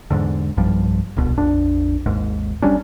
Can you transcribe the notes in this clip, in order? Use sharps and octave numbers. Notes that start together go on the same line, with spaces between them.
E2 G#2 D3
B1 G2 F3 G3
D1 C2 B2
A#1 F2 D4
G#1 D#2 G#2
G1 G3 C#4 D4